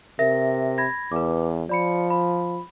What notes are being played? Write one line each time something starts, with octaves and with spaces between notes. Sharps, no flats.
C3 A#4 E5 A#6
B5 G#6 A#6
E2 B4 D6
F3 D5 B5 C#7
B5